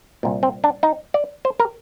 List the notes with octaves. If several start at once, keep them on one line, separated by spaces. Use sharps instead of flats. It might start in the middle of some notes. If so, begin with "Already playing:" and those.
C2 A#2
C4
D4
D#4
D5
C5
A#4